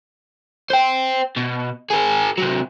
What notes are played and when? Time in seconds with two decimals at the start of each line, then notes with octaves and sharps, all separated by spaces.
0.70 C5 G5
1.37 B2
1.90 G#4 A#4
2.37 C3 F#3